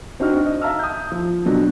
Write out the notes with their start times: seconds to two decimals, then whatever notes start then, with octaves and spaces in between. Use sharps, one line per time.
0.20 C4 D4 D#4 F#4 D#5 F6
0.46 D#5
0.61 E5 F5 A5 A#5 E6 F6
0.79 D#6 G6
1.12 F3
1.45 B2 F#3 D4